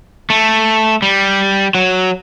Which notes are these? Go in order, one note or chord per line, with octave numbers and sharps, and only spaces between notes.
A3
G3
F#3